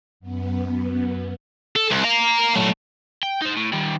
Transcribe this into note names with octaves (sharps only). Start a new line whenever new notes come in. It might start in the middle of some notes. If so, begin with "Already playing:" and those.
F#2 B3
A4
C2
F5 A#5
F#3 A3
G5
D#4 C5
A2
D#3 G3